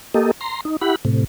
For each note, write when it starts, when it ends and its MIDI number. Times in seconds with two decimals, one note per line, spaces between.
0.14 0.31 58
0.14 0.31 67
0.14 0.31 69
0.14 0.31 75
0.41 0.61 82
0.41 0.61 84
0.65 0.77 63
0.81 0.96 64
0.81 0.96 67
0.81 0.96 78
0.81 0.96 83
1.05 1.24 45
1.05 1.24 48